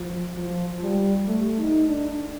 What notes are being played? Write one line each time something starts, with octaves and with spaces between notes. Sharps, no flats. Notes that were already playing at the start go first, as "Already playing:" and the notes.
Already playing: F3
F3
G3
A3
D#4
D4